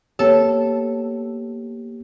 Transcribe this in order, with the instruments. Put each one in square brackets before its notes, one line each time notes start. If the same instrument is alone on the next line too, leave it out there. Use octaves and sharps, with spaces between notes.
[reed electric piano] A#3 B3 G4 [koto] A4 [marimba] C#5